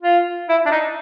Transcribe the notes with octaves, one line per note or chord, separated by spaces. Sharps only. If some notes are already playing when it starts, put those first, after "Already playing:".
F4
E4
D4
D#4